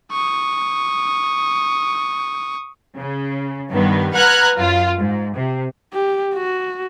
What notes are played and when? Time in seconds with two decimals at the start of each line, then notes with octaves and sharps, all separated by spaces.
0.12 C#6 D#6
2.98 C#3
3.71 G2 D#3 B3
4.16 B4 F#5 A#5 F6 F#6 G#6
4.57 F#2 F4
4.99 G#2
5.36 C3
5.94 G4
6.35 F#4